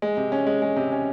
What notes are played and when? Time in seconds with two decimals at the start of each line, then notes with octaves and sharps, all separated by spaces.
0.02 G#3
0.17 C3
0.32 C#4
0.47 G#3
0.62 G#3
0.76 C3
0.92 C#4